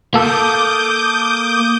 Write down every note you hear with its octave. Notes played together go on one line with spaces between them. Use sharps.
A#3 A4 D6 D#6 G6